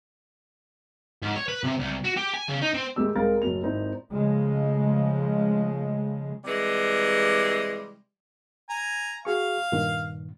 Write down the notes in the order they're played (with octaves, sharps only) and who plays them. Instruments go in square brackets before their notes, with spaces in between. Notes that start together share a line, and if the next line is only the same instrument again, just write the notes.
[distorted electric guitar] G#2
C#5
B4
C3
C2
F#4
G4
G#5
C#3
D#4
C4
[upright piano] D#2 G#3 A3 G4 E6
C2 G#3 G#4 A#4 F5 A6
F#1 F#3 A3 F7
G#1 C4 D#4 E4 A4
[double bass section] C#3 F3 G#3 A3
[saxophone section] C3 E3 G3 G#3
[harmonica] G#5 A#5
[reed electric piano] F#4 G#4 C#6 [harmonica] F5
[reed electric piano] G2 A#2 D#3